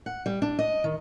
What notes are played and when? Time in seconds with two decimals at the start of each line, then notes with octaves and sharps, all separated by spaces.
0.06 F#5
0.26 G3
0.42 D4
0.59 D#5
0.84 D#3